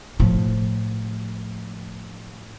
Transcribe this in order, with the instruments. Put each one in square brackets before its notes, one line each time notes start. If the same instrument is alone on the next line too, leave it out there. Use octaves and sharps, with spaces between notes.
[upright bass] A2 F3